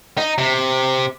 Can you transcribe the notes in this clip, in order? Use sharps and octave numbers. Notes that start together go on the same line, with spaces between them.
D#4
C3